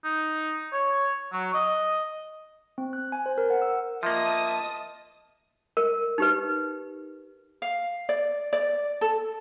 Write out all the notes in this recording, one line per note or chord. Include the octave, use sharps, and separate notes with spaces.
D#4
C#5
F#3
D#5
C4
F#6
G#5
C5
A#4
F#5
E6
F3 A#3 D#5 E5 A5 D#6
A#4
D#4 G4 B4
F5
D5
D5
A4